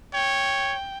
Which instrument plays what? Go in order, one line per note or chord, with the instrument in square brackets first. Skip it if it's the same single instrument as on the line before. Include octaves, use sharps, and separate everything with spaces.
[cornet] C#5 [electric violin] G5